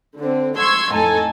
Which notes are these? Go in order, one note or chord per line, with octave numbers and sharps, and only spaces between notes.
D3 C4
C6 C#6 E6 G#6
F2 A2 D#4 A4 G#5